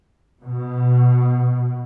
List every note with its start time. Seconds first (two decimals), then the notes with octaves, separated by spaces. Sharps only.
0.41 B2